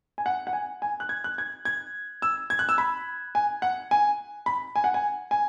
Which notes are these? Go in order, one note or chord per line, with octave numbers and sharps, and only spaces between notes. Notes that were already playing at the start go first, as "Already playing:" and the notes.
G#5
F#5
F#5
G#5
G#5
F#6
G#6
F#6
G#6
G#6
E6
G#6
F#6
E6
B5
G#5
F#5
G#5
B5
G#5
F#5
G#5
G#5